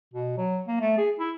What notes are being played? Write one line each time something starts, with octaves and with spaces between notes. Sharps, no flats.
B2
F#3
A#3
A3
G#4
E4